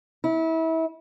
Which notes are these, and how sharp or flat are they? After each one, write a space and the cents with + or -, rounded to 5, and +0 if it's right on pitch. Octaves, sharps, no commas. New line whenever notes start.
E4 -30